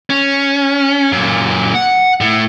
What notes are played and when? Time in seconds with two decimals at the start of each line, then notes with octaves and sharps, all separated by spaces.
0.10 C#4
1.12 F#2 A#2
1.74 F#5
2.21 A2